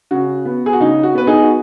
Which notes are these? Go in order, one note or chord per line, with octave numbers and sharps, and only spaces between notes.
C#3 F#4
B3
G#4
F#4
C#3 D#4
F#4
B3 B4
D#4 G#4
F#4